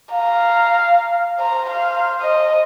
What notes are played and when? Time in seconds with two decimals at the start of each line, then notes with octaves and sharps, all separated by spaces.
0.12 F5 A#5
1.40 C5 A#5
1.70 F5
2.21 D#5